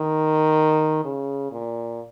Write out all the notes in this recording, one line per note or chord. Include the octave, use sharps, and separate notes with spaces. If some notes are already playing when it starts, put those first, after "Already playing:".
Already playing: D#3
C#3
A#2